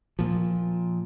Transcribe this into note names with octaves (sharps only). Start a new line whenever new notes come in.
A#2 F3